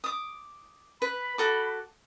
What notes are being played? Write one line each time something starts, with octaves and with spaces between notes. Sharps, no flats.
D6 D#6
B4 B5
F#4 A4 D6